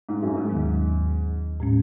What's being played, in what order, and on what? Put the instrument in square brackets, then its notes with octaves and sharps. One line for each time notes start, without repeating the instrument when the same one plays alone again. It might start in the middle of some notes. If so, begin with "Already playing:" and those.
[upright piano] G#2
F#2
G#2
[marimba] D#2 D#3 F#3 B3
A2 G#3 C#4